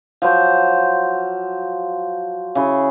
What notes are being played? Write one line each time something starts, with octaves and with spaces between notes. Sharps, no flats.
F3 F#3 C5
C#3 E4 G#4